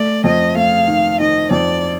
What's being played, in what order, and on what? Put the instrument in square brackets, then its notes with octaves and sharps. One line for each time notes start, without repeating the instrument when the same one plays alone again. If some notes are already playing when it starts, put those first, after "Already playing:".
Already playing: [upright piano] A3 [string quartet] D5
[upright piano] F2 [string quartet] D#5
[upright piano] A3 [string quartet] F5
[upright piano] D#3
[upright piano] D#3 [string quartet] D#5
[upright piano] F2 [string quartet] D5